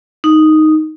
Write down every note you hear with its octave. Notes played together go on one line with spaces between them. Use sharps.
D#4